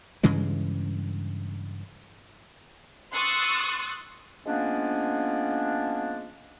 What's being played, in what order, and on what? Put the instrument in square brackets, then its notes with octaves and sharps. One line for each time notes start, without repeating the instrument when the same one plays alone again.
[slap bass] G2 C#3 E3 G#3
[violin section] C6 C#6 D#6 E6 F#6 A6
[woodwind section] F3 G#3 A#3 B3 C#4 D4